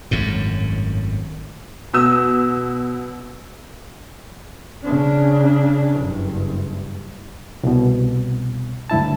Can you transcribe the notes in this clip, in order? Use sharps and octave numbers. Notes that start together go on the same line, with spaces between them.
G#1 F#2 A2
B2 D#6 E6
C#3 D4
F#1 G2
C2 B2
D2 G2 E4 A5